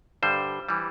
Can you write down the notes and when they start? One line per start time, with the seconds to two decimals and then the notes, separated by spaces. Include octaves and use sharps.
0.23 G2 D3 G3 C5
0.69 E3 G3